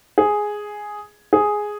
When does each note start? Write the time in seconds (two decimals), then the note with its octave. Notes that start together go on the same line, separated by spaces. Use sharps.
0.18 G#4
1.33 G#4